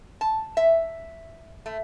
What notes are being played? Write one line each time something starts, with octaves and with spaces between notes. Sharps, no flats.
A5
E5
A3